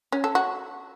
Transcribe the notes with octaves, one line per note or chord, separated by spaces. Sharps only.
C#4
A4
F#4